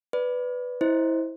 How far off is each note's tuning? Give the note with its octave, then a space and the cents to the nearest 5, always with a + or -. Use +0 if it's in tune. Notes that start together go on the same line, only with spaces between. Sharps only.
B4 +10 D5 +0
E4 -15 C5 +0 D#5 +0